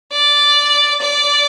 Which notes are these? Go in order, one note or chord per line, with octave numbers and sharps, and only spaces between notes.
D5
D5